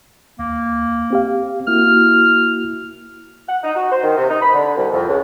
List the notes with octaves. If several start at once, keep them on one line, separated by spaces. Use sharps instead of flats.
D#2 A#3
C4 G4 F5
A#3 E4 F#4 F6
F#5
D#4
F#4
C5
D#3
C3
D#4
B5
D3
C2
F2
C#2